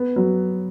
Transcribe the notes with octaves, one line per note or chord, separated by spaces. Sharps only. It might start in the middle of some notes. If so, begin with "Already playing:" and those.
Already playing: B3
F#3